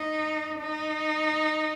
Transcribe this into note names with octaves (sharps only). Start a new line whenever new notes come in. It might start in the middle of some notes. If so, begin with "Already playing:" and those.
Already playing: D#4
D#4